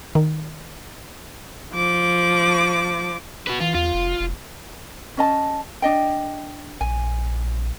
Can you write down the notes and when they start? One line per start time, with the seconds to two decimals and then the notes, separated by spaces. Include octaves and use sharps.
0.15 D#3
1.74 F3 D6
3.47 F#4 B4
3.60 E3 F4
3.75 E2 F4
3.94 F1
4.20 F1
5.17 C#4 D#5 A5
5.82 D4 D#5 G5
6.81 A#1 G#5